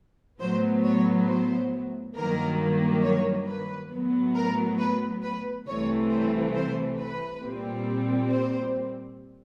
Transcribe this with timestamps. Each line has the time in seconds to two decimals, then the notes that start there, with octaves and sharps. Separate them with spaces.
0.40 A2 F#3 B3 C5
0.84 C#5
1.28 C5
2.16 G2 D#3 F#3 A#3 A#4
3.04 C#5
3.47 B4
3.91 A2 F#3 B3
4.35 A#4
4.79 B4
5.23 B4
5.67 C2 C3 E3 A3 C4 C#5
6.11 C5
6.55 C5
6.99 B4
7.42 A#2 G3 C4
8.31 C5